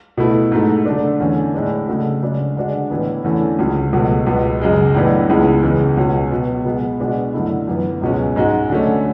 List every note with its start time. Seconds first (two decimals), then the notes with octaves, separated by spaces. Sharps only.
0.17 B2 A3 E4
0.52 G#2 F#3 A3
0.85 D3 A3 D4
1.20 E2 D3 A3 C#4
1.54 A2 G#3 D4
1.88 C#3 F#3 A3 D4 F#4
2.22 C#3 G#3 D4 F#4
2.56 D3 G#3 D4 F#4
2.90 A2 E3 B3
3.24 E2 D3 A3 C#4 E4
3.59 C#2 C#3 F#3
3.93 C#2 B2 F#3 A3
4.26 C#2 B2 F#3 B3
4.61 F#2 C#3 G#3
4.94 A2 E3 B3 D4
5.29 C#2 C#3 G#3 B3 E4
5.63 E2 C#3 E3 G#3 B3
5.97 C#2 B2 F#3 C#4 F#4
6.31 B2 F#3 B3
6.65 B2 G#3 B3
7.00 B2 G#3 D4 F#4
7.34 F#2 D3 A3 E4
7.68 F#2 E3 B3
8.02 C#2 B2 G#3 C#4
8.36 G#2 G#3 C#4 F#4
8.70 D3 F#3 A3 C#4